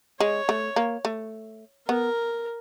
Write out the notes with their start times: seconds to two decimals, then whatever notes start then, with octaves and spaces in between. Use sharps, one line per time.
0.20 G#3 C#5
0.49 A3
0.76 A#3
1.05 A3
1.88 B3 A#4